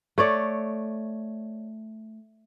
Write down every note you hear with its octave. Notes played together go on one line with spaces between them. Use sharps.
A3 C#5 D5